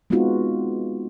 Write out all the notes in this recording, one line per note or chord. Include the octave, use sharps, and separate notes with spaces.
G#3 B3 C4 D#4 F4 F#4